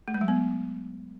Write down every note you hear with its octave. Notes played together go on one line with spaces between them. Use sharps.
A3
G#3
F#3
B3